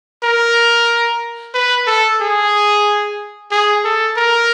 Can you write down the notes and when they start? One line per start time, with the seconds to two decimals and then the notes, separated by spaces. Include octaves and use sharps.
0.23 A#4
1.54 B4
1.87 A4
2.21 G#4
3.51 G#4
3.84 A4
4.17 A#4